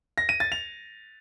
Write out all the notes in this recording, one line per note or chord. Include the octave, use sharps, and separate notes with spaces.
A#6
D#7
A6
F7